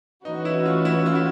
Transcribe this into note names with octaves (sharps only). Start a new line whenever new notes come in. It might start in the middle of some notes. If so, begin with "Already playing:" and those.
E3 A3 C#4 D#4 F#4 B4
E4
F4
E4
F4
E4